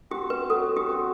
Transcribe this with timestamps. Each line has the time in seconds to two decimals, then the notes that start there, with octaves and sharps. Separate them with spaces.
0.11 C4 F#4 G4
0.30 B4
0.50 F#3 A4
0.77 G4
0.89 C4 F#4